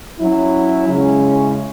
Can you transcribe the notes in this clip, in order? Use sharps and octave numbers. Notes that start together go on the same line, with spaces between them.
F#3 C#4 E4
C#3 G#3 C#4 E4